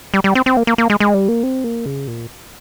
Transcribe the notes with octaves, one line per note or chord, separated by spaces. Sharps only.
G3
G3
C4
C4
A#3
A#3
A#3
G#3
G#3
G3
A#3
C4
A#3
C#3
A#2